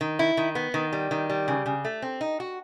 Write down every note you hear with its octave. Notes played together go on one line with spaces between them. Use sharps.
D#3
E4
D#3
B3
D#3
G3
D#3
G3
C#3
C#3
A3
C4
D#4
F#4